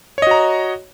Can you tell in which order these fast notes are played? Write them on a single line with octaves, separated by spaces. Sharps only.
C#5 D#5 F#4 A#5